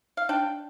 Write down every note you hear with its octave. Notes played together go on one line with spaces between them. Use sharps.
F5
D4 G5